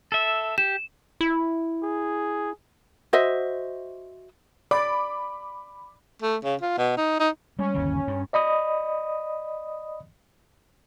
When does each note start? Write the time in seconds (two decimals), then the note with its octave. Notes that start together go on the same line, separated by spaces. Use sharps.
0.12 A4 E5
0.58 G4 E7
1.21 E4
1.83 G#4
3.13 F#4 C5 D#5 E5
4.71 D5 B5 D6
6.22 A3
6.44 C#3
6.61 F4
6.78 B2
6.97 D#4
7.20 D#4
7.59 G3 G#3 C#4
7.74 G1 D#2 C#3
8.07 G2
8.33 D5 D#5 B5 D#6